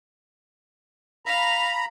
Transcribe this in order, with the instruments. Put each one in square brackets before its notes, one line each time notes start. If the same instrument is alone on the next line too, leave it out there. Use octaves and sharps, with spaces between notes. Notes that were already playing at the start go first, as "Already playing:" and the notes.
[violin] F5 F7 [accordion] A#5 B5